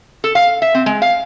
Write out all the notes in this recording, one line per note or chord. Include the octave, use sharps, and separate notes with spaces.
A4
F5
E5
C4
G#3
F5